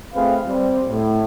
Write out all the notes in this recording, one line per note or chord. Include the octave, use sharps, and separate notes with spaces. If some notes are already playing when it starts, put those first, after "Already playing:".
A3 C4 F4 G#4 B4 F5
G3 C4
A2